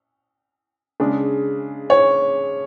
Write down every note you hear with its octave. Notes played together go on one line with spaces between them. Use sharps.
C#3 G#3 D4
C#5